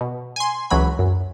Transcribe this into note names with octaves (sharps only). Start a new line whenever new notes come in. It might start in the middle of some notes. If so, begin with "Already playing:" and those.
B2
G#5 C6
C#2 E3 F#3 B5
F#2